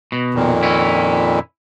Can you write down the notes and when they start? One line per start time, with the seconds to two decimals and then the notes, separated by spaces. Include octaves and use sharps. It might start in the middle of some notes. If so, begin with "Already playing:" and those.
0.12 B2
0.34 F2 A#2 D#3
0.63 C#4 E4